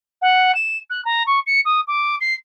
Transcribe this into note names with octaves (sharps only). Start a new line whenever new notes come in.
F#5
E7
F#6
A#5
C#6
C#7
D#6
D6
C7